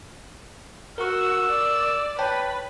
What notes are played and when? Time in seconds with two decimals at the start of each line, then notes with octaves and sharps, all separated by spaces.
0.98 F#4 A#4 C#6 E6
1.49 D5
2.19 B4 C#5 G5 A5